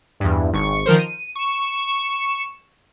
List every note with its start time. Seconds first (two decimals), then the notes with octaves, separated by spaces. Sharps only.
0.20 E2 G2
0.53 G#1 C#6 C#7
0.86 D#3 F3 A#4 C5
0.98 D#7
1.35 C#6 E7